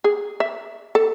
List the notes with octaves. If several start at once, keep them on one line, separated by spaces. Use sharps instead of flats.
G#4
E5
A4